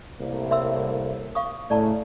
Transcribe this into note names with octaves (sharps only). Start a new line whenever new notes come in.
C2 A2 A#3
E5 C6 E6
F5 C#6 D#6
A2 C#3 A3 D5 A5 A#5